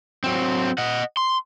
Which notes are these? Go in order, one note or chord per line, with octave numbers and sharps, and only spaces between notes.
F#3 C4
D#5 F#5
C6